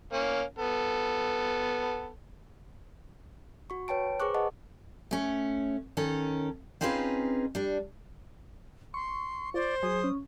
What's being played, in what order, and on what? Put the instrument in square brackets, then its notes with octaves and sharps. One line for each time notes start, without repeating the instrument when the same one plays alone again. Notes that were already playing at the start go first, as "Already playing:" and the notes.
[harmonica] A#3 C#4
B3 A4
[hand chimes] F#4 C#6
B4 C#5 G5 A5 D7
G#4 B4 C5 C#6 D6 F#6
G#4 B4 D#5 F#5 A5
[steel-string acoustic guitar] A3 C#4
D#3 C#4 A4
C4 C#4 D#4 F4 G#4 B4
G3 D4
[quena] C6 [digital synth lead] C#6
[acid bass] F4 [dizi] C5 [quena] D5
[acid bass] F#3 [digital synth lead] G#4 [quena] D#6
[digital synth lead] C#4